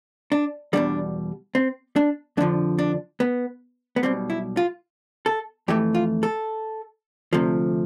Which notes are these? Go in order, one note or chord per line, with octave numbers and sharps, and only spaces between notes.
D4
E2 B2 G3 D4
C4
D4
F2 D3 F3 D4
D4
B3
B3
B1 B2 G3 C4
E4
F4
A4
F2 E3 A3 G4
F4
A4
D2 C3 F3 A3